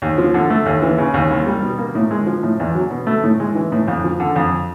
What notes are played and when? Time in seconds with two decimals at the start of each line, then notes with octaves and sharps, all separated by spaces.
0.02 D#2
0.18 F3
0.34 D3
0.50 A3
0.66 D#2
0.82 E3
0.98 C#3
1.14 D#2
1.30 C2
1.46 G3
1.63 B2
1.78 A#3
1.95 A2
2.11 G#3
2.26 F3
2.43 A2
2.59 E2
2.75 F#3
2.91 B2
3.07 A3
3.24 A2
3.40 G#3
3.55 E3
3.72 A2
3.88 F2
4.04 F3
4.20 D3
4.36 F2